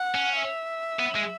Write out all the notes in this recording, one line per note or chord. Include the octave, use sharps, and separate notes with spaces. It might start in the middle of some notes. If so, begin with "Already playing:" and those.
Already playing: F#5
C#4
E5
B3
G#3